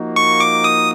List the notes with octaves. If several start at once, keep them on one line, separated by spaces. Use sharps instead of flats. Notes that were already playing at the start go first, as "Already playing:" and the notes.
Already playing: F3 A#3 D#4 F#4
C#6
D6
D#6